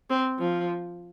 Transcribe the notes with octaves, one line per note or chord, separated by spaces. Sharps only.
C4
F3